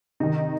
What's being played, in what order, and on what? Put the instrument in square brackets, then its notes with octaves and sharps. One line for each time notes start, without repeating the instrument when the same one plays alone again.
[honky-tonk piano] C3 D#3 D#4